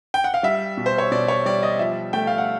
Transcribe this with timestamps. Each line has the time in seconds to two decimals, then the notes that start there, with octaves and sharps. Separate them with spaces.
0.14 G5
0.24 F#5
0.34 F5
0.43 G3 E5
0.77 B2
0.86 C5
0.98 C#5
1.11 B2 D5
1.28 C#5
1.46 G3 D5
1.63 D#5
1.79 F3 E5
2.13 A3 G5
2.27 F5
2.38 F#5